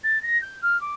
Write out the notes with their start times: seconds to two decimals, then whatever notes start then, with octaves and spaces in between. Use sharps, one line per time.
0.04 A6
0.23 A#6
0.42 G6
0.62 F6
0.81 D6